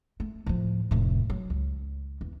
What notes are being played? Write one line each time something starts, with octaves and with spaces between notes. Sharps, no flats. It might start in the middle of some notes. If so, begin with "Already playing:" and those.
A3
A2 F3
F1 A2
F#3
C#2
E2